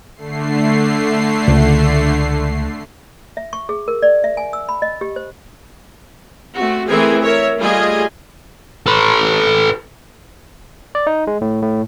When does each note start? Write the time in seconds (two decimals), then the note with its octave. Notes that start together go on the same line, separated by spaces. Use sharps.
0.15 D3 A3 C7
1.48 C#2
3.37 E5
3.53 C#6
3.69 G#4
3.88 A#4
4.02 D5
4.24 E5
4.37 G#5
4.53 E6
4.69 B5
4.82 D#5
5.01 G4
5.16 C5
6.54 A3 C4 F#4
6.89 E3 A3 C4 G#4 A#4 G#5
7.23 A#4 C#5 E5
7.59 G3 A3 F4 G#4 D#5 G#5
8.86 A4 B4
10.95 D5
11.07 D#4
11.27 G#3
11.41 A2
11.63 A2